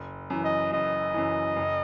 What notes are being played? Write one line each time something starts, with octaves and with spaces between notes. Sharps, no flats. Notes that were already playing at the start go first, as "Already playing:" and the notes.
Already playing: F#1
F#2 E3
D#5
F#1 D#5
F#2 E3
F#1